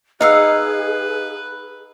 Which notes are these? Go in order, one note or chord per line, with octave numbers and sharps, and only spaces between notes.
D#4 G#4 B4 D#5 F5 F#5 E6